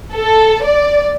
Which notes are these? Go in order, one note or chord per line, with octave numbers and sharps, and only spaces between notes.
A4
D5